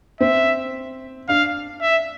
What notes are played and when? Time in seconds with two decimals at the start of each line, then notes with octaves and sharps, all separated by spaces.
0.20 C4 E5
1.28 D4 F5
1.81 E5